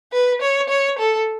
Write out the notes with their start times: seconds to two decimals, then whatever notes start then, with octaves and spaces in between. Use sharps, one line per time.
0.13 B4
0.41 C#5
0.69 C#5
0.98 A4